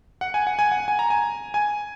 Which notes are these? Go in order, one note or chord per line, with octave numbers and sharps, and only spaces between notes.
F#5
G#5
F#5
G#5
F#5
G#5
A#5
G#5
G#5